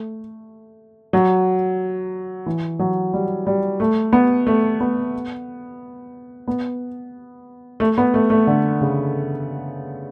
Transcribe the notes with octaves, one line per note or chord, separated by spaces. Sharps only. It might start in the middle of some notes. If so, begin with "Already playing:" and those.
Already playing: A3
F#3
E3
F#3
G3
G3
A3
B3
A3
B3
B3
A3
B3
A3
A3
D3
C#3